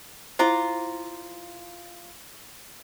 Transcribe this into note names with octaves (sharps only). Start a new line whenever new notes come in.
E4 F4 C5 A#5 D6